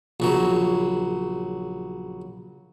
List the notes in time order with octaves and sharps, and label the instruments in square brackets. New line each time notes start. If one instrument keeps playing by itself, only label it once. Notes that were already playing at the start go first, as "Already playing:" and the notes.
[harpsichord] A#1 C#3 F#3